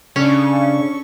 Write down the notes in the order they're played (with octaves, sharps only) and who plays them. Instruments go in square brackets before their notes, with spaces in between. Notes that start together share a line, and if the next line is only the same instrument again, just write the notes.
[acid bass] C#3 [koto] C#4 [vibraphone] D4 D5 [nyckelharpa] A4 C#6